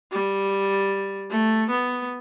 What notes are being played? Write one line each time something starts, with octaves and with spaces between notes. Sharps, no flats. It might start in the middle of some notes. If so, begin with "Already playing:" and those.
G3
A3
B3